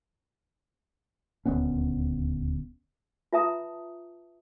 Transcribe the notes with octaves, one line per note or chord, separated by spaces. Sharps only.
D#1 D2 B3 C#4
F4 B4 E5 A5 A#5 D#6